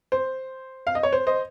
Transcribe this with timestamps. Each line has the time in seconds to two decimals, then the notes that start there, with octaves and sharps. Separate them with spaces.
0.12 C5
0.87 F5
0.95 D#5
1.03 C#5
1.13 C5
1.27 C5 D#5